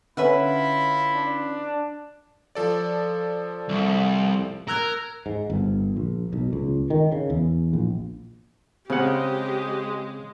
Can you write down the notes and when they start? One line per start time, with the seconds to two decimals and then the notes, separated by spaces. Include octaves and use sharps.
0.17 D3 C#4 E4 F4 B4 E5 F#5 B5
1.14 D4
2.55 F3 A4 D5
3.69 C2
4.69 A#4 E6 F#6 G#6
5.26 G#2
5.50 G1
5.97 A#1
6.33 B1
6.53 C#2
6.90 D#3
7.12 C#3
7.30 E2
7.73 A#1
8.90 C#3 G#3 C4 G4 F#5